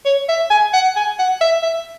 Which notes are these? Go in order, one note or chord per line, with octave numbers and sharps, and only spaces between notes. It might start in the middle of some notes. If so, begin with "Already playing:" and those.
C#5
E5
G#5
F#5
G#5
F#5
E5
E5